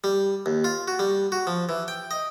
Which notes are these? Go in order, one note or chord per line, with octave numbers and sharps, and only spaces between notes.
G3
D#2
F4
F#4
G3
F#4
F3
E3
G5
D#5